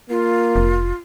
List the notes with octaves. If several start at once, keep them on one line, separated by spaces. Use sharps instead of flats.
A#3 F4
F1